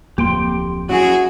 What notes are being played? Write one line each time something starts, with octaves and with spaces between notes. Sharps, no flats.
D1 F2 A#3 G4 G5 C6
F#3 C#4 E4 F#4 G#4